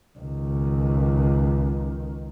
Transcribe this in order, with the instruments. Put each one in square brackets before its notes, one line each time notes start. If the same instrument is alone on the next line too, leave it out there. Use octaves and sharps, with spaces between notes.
[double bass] C#2 D#3